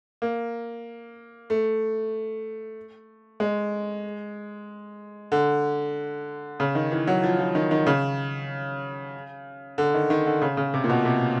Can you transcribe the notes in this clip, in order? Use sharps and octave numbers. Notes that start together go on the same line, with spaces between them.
A#3
A3
G#3
D3
C#3
D#3
E3
F#3
F3
F3
D#3
D#3
C#3
D3
D#3
D#3
D3
C#3
C#3
C3
A#2
B2
C3